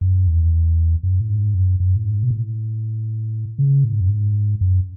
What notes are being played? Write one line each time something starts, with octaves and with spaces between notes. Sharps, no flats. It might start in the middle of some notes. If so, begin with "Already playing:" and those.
F#2
E2
F#2
A2
G#2
F#2
F#2
A2
G#2
B2
A2
C#3
A2
G#2
F#2
G#2
F#2